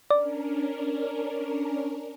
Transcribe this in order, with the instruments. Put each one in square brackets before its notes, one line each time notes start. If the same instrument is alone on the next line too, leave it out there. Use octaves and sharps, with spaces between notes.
[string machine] C#4 D4 A#4 [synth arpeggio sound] D5